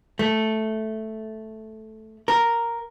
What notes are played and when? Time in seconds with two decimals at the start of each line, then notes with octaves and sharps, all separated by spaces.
0.19 A3
2.28 A#4